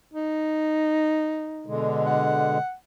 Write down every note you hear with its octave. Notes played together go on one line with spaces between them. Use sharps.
D#4
B2 D3 G#3
F#5